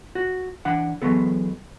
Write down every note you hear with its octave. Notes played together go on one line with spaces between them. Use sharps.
F#4
E3 D4 F#5
E3 F#3 G#3 B3 A4